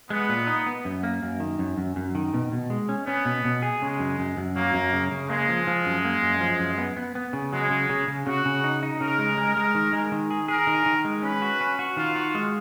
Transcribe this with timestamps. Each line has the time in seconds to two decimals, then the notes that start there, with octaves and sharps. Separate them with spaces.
0.10 G#3 B3
0.29 A#2
0.47 D#4
0.66 B3
0.85 F#2
1.03 A#3
1.23 F#2
1.40 D#3
1.59 F#2
1.78 F#2
1.96 F#2
2.15 D#3
2.34 B2
2.52 B2
2.70 G#3
2.89 C#4
3.07 B3 C#4
3.25 B2
3.45 B2
3.62 G#4
3.81 C#3 G#3
3.99 F#2
4.19 F#2
4.37 F#2
4.56 F#3 A#3
4.74 F#2
4.93 C#3
5.11 C#3
5.29 G#3 A#3
5.49 F3
5.67 F3
5.86 F#2
6.05 A#3
6.23 F#2
6.41 F3
6.59 F#2
6.78 B3
6.97 B3
7.15 B3
7.33 C#3
7.52 F#3 G#3
7.70 C#3
7.89 C#3
8.08 C#3
8.26 C#3 F#4
8.45 C#3
8.64 D#4
8.83 D#4
9.01 C#3 A#4
9.19 G#3
9.37 G#3
9.57 G#3
9.75 D#3
9.93 G#3
10.12 D#3
10.31 G#4
10.48 G#4 A#4
10.67 D#3
10.86 D#3
11.05 G#3
11.23 C#4 B4
11.42 F#4
11.61 C#4
11.79 F#4
11.97 D#3 F4
12.16 F#4
12.35 G#3